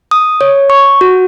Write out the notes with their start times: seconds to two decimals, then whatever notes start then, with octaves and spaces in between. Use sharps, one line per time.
0.11 D#6
0.41 C#5
0.70 C#6
1.01 F#4